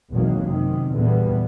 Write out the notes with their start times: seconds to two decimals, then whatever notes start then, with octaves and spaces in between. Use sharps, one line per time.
0.11 G#1 E2 B2 D#3 F#3 A#3
0.40 F#2 C3 D#3
0.94 A#1 E2 A#2 D3 G3 B3